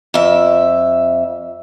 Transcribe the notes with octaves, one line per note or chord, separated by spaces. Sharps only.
F2 E5